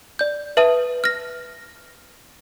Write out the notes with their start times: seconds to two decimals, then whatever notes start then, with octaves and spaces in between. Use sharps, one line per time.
0.19 D5 G6
0.57 B4 E5 A5 D#6 D#7
1.04 F6 A#6